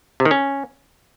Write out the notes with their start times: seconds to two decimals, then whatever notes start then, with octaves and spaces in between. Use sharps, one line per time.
0.20 C3
0.25 D#3
0.31 C#4